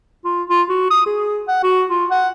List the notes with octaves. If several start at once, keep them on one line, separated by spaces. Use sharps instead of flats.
F4
F4
F#4
D#6
G#4
F#5
F#4
F4
F#5